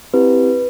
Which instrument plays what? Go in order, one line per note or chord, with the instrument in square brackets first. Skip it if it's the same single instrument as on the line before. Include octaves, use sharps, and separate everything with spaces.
[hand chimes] C4 E4 G4 B4